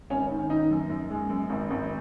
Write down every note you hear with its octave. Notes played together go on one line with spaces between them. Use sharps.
G#1 C#4
D#3
D#3 D#4
F#2
F#2
G#3
F#2
G#1
G#1